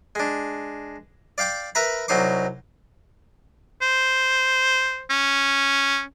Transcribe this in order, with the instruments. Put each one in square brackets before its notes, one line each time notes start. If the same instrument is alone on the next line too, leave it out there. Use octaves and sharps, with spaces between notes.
[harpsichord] G#3 D4
D5 F5 G5 D6
A#4 B4 E5 A#5 B5
C2 F#3 D#4 C6 D6
[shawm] C5
C#4